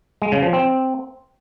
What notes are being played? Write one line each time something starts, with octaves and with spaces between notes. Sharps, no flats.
G#3
C#3
F3
C4